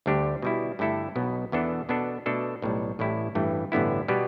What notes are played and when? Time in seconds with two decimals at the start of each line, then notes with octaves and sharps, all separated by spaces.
0.06 D2 D3 G3 D4 G4
0.42 B2 G3 E4
0.79 G2 D3 A3 E4 A4
1.16 B1 B2 B3
1.52 E2 E3 B3 D4 A4
1.89 B2 B3 D4 A4
2.26 B2 A3 D4 A4
2.62 B1 A2 G3
2.99 A1 A2 G3 E4
3.35 A1 G2 E3 A3
3.72 A1 G2 D3 B3 E4
4.08 B2 G3 B3 G4